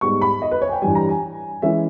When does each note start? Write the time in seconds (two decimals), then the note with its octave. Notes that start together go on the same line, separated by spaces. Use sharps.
0.01 G#2 G3 B3 C#6
0.21 B5
0.42 D#5
0.51 B4
0.62 C#5
0.68 G#5
0.72 G5
0.82 G2 E3 G3 G#5
0.95 A#5
1.09 G#5
1.62 E3 G#3 C#4 E5